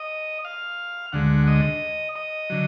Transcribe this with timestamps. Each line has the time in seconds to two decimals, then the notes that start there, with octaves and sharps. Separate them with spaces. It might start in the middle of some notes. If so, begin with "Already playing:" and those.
Already playing: D#5
0.45 F5
1.12 D2 D3 G#3 F#5
1.47 D#5
2.16 D#5
2.50 D3 F#3